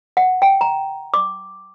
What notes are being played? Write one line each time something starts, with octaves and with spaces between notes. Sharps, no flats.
F#5
G5
A#5
D6